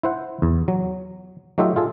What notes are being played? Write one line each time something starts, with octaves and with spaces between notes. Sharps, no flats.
E4 C5 F#5
E2
F#3
F#3 A3 D#4 F4 G4 E5
F4 G#4 A4